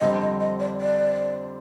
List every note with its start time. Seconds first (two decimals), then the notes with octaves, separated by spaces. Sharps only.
0.01 F2 D3 G3 C4 D#5
0.21 D#5
0.40 D#5
0.60 D5
0.81 D5